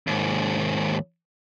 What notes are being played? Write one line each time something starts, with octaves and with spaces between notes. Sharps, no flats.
D#2 G#2